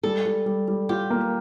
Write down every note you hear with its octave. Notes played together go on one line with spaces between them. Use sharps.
G3 A4
G3
G3
G3
F4 G4
A#3